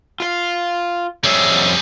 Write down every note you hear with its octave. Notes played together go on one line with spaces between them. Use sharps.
F4 F5
F2 G3 G#4 C#5 E5